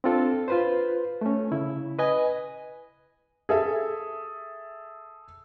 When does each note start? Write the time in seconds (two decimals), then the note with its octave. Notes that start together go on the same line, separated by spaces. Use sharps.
0.04 C4 D4 F4 A4
0.48 F4 B4 C5
1.21 A3 C#4
1.52 C#3 E4
1.99 B4 D#5 G#5
3.49 G#4 A4 E5